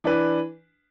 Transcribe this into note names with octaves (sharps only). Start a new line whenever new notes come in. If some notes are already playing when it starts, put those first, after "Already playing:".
E3 D4 B4